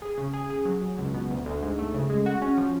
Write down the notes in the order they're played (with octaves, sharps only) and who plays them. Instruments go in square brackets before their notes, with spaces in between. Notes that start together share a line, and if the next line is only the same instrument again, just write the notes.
[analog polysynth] G#4
C#3
G#4
G#4
F#3
F#3
C#2
B2
D2
D2
G#2
A3
C#3
G#3
F#4
C#4
F3